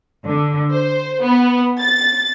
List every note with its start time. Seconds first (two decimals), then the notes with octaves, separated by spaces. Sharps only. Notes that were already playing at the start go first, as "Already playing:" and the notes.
0.25 D3
0.74 C5
1.25 B3
1.81 A6